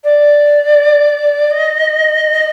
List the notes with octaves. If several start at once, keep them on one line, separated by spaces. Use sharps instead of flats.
D5
D#5